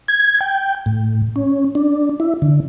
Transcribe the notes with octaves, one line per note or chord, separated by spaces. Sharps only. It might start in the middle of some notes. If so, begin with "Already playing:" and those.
G#6
G5
A2
C#4
D4
E4
D3